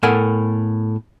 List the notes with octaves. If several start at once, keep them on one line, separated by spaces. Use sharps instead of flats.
A2 B3 A4 A#4 F#5 G#5